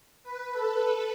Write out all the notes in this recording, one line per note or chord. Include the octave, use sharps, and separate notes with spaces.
B4
A4